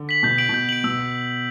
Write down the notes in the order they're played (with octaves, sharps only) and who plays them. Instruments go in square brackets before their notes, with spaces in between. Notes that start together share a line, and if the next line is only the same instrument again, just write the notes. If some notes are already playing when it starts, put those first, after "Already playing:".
Already playing: [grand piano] D3
[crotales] B6 F#7
[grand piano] B2 [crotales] G6
[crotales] D7 F#7
[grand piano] B2 [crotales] G6
[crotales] D7 F#7
[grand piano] B2 [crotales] E6